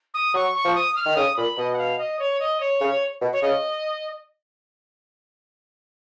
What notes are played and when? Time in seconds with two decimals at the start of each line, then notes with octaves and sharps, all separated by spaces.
0.14 D#6
0.34 F#3 C#6
0.54 C#6
0.64 F3
0.75 D#6
0.96 F6
1.06 D#3
1.16 C#3 D#6
1.36 A#2 B5
1.57 B2 D#5
1.73 F#5
1.78 F5
1.98 D#5
2.19 C#5
2.39 D#5
2.60 C#5
2.80 C#3
3.21 B2
3.33 C#5
3.42 C#3 D#5